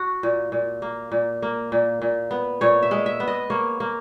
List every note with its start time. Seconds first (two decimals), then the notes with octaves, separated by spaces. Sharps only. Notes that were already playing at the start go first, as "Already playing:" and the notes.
Already playing: F#4
0.23 A#2
0.52 A#2
0.82 A#3
1.12 A#2
1.42 A#3
1.72 A#2
2.02 A#2
2.31 B3
2.61 A#2 C#5
2.83 E5
2.91 G#3
3.06 E5
3.20 B3
3.28 D#5
3.50 A#3 C#5
3.80 A#3